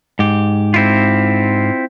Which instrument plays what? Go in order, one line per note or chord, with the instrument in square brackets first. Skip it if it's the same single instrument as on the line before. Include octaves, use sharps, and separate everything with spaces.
[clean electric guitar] G#2 G4
[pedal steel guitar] C4 E4 F4